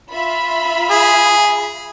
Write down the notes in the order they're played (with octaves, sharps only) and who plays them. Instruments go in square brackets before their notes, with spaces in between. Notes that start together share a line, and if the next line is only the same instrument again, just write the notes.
[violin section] F4 E5 B5
[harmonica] G#4